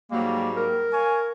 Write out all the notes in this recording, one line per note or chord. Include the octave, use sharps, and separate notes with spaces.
G#2 F#3 G3 A#3
A#4
C#5 F5 G#5